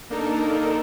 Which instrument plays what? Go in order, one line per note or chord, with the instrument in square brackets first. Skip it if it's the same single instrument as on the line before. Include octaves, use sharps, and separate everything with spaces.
[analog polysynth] A#3 D4 D#4 A4 A#4